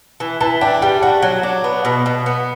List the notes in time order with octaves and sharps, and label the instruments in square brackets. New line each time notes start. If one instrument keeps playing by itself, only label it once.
[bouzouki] E3
[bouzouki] E3 [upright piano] A5
[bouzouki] D4 [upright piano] G5
[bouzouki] G3 [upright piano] G5
[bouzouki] F#4 [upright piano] F#5
[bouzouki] F#3
D4
B3
B2
B2
B3